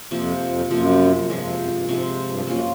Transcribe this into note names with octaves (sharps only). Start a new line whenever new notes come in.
F2 C3 F3 A#3
F2
F#2 C3 F3 A#3
G2 C3 F3 G#3
F2
F#2
G2
G#2 C3 F3 G#3
G2
F#2 A#3 C#4 F4